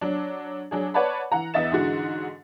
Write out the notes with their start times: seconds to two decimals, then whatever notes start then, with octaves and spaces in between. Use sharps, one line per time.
0.01 F#3 D4
0.71 F#3 D4 G#4
0.94 B4 C#5 D5 F#5 A5 B5
1.32 E3 F#5 A#5
1.54 E2 B3 D#5 E5 A6 E7
1.72 G#2 D3 E3 G#3 F#4